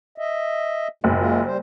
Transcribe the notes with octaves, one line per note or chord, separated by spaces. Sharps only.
D#5 E5
F#1 G#2 B2 G#3
G#3 F4
G3 C5